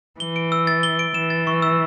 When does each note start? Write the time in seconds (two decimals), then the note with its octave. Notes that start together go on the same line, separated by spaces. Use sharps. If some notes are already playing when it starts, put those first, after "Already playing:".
0.20 E3 G7
0.36 D7
0.52 E6
0.67 A6
0.83 G7
0.99 D7
1.14 E3 E7
1.30 A6
1.47 C#6
1.62 E6